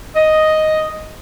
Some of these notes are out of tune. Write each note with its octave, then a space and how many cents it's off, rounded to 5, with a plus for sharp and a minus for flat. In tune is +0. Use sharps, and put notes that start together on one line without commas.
D#5 +0